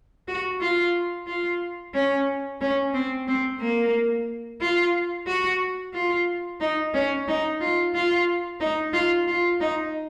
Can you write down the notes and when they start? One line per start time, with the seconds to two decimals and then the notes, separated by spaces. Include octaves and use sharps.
0.28 F#4
0.61 F4
1.27 F4
1.94 C#4
2.61 C#4
2.94 C4
3.28 C4
3.61 A#3
4.61 F4
5.27 F#4
5.94 F4
6.61 D#4
6.94 C#4
7.28 D#4
7.61 F4
7.94 F4
8.60 D#4
8.93 F4
9.27 F4
9.60 D#4